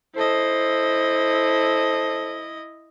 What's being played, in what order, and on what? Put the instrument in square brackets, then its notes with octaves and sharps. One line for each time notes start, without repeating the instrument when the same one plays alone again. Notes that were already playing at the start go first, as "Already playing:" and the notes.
[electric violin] E4 D#5 [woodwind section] A4 C5